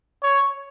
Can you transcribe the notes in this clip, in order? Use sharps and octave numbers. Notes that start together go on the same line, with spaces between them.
C#5